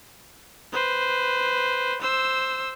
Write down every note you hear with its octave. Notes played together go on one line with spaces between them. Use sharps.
B4 C5
C5 E6